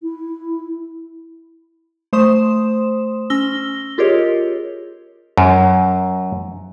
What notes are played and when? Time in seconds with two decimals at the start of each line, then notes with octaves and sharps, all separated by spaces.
0.02 E4
2.13 A3 C5 C6 D#6 E7
3.30 C#4 E6 A#6 G7
3.98 F4 G4 G#4 A#4 C#5 D#5
5.37 F#2